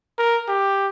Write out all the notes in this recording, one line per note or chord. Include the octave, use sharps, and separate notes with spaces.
A#4
G4